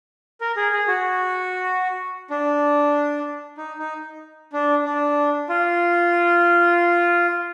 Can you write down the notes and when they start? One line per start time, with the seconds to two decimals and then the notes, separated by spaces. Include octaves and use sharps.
0.41 A#4
0.56 G#4
0.72 G#4
0.88 F#4
2.30 D4
3.58 D#4
3.79 D#4
4.53 D4
4.85 D4
5.49 F4